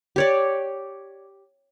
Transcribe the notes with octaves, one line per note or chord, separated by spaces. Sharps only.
G4 C#5 D5